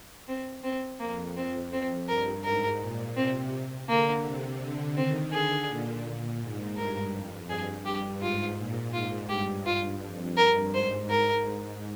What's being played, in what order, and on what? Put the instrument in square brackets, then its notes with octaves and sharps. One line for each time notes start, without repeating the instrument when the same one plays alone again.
[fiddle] C4
C4
[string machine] F2 [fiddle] A#3
[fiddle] C4
[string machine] F2 [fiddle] C4
[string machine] G2 [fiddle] A#4
[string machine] G#2 [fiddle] A#4
[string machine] A#2
[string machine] C3 [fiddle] C4
[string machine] D3 [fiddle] A#3
[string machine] C3
D3
[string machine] D#3 [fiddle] C4
[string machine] D3 [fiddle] G#4
[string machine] A#2
A#2
G#2
[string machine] G2 [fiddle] A#4
[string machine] F2
[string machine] G2 [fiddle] G#4
[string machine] G2 [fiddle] G4
[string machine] G#2 [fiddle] F4
[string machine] A#2
[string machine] G#2 [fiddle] F4
[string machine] G2 [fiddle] G4
[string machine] G2 [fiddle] F4
[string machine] F2
[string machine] G2 [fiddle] A#4
[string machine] G#2 [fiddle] C5
[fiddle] A#4